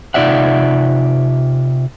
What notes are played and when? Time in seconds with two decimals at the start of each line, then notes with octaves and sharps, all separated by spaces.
0.14 C3 D#4 F4 D5 E5 F#5